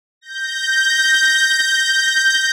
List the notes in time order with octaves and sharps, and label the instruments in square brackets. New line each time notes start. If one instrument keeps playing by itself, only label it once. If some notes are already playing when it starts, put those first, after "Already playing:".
[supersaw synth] G6 A#6